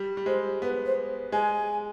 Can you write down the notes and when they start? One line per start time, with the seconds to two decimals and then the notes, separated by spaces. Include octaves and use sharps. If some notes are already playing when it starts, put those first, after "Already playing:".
Already playing: G3
0.17 G3
0.26 G#3 C5
0.61 B3 B4
0.85 C5
1.32 G#3 G#5